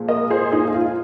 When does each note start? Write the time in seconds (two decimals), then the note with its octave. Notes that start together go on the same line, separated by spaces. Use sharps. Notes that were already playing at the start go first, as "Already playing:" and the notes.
Already playing: A#2 F3 G#3
0.08 A#4 D#5
0.30 G#4 C5
0.52 D#4 G#4
0.68 G#4
0.74 F4